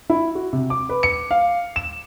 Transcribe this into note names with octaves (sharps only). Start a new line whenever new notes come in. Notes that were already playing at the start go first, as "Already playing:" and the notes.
E4
F#4
C3
D6
B4
C#7
F5
E7